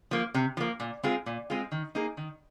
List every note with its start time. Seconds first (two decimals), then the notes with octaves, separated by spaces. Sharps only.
0.11 F3 A#3
0.34 C3
0.57 F3 A#3
0.80 A#2
1.03 G#3 C4 F4 G#4
1.26 A#2
1.50 G#3 C4 F4 G#4
1.72 D#3
1.95 A#3 D#4 G#4
2.17 D#3